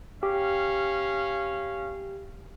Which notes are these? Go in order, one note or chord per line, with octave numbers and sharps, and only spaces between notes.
C#4 G4 F5